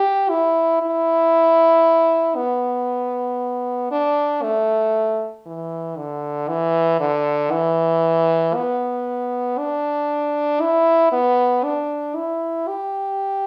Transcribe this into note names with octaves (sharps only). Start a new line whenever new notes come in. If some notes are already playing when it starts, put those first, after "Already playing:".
Already playing: G4
E4
E4
B3
D4
A3
E3
D3
E3
D3
E3
B3
D4
E4
B3
D4
E4
G4